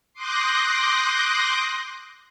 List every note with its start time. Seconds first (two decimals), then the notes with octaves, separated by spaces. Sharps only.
0.14 C6 D6 D#6 F#6 G6 A#6